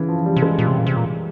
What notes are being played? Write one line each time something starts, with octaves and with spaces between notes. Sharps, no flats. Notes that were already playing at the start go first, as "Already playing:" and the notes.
Already playing: C#3 E3
F3
G3
C3
G#3
A#2
C3
A#2
C3
A#2